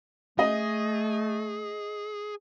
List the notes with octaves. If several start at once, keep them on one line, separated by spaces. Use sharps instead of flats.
A3 G#4 D#5